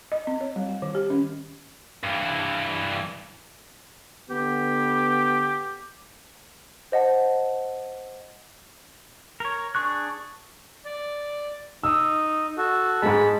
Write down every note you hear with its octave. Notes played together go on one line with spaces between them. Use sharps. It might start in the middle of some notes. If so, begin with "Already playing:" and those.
D#5
C4
C#5
G3
G3
D#3
G4
C#4
G2 E3
D3 B3 G4
C5 D#5 F#5 A5
A#4 C#5
D4 G#4 C#6 F#6
D5
D#4 E6
F#4 A4
G#2 G#3 A5 B5